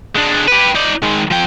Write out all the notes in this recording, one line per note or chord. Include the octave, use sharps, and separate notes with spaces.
G#3 D4
G4 B4
D#4 D5
D#3 G#3
F3 G5